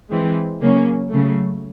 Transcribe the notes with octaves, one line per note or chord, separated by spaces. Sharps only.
E3 G#3 C4
C#3 F#3 A#3 C#4
C#3 F#3 A3